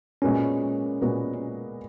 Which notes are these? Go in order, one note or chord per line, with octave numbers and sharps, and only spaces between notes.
A#2 G#3 B3 C#4 F#4 A#4
A#2 G#3 B3 F#4 A#4